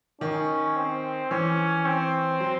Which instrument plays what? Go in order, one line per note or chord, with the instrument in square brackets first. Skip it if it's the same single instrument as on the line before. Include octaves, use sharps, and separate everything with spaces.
[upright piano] D#3 [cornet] C#4
[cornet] C4
[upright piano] E3 [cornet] C#4
[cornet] C4
[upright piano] F#3